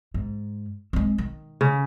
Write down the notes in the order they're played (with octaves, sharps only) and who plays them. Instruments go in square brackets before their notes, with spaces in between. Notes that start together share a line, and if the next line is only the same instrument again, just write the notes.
[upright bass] G#2
G#3 C4
D#3
[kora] C#3